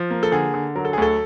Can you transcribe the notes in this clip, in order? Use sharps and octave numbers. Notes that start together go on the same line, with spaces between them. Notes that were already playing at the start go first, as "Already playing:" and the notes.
Already playing: F3
A#3
A4
D3 G#4
D3
F#3 A#4
A4
G#4
D2 A4